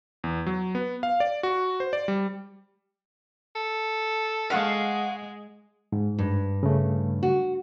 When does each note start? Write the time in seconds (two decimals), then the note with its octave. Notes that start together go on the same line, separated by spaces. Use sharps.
0.24 E2
0.46 F#3
0.75 B3
1.03 F5
1.20 D5
1.43 F#4
1.80 C5
1.93 D5
2.08 G3
3.55 A4
4.50 G#3 F5 F#5 C#6
5.92 G#2
6.19 G2
6.63 C#3 A3
7.23 F#4